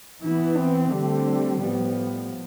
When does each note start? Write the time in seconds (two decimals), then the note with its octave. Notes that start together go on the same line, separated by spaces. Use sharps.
0.22 E3 B3 E4
0.57 C4
0.92 D3 G3 A3 C4
1.63 A2 F3 B3